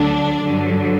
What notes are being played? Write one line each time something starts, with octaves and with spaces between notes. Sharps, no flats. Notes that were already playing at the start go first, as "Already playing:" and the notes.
Already playing: D2 D3 F#3 D4
G2 D3 F#3